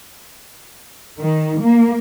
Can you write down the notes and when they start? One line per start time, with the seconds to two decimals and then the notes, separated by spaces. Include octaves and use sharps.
1.19 D#3
1.62 A#3